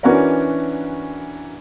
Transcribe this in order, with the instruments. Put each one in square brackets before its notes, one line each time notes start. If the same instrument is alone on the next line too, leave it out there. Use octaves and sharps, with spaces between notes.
[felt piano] E3 C#4 D4 F#4 A#4 D5